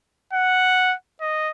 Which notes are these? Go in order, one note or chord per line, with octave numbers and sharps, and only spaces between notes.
F#5
D#5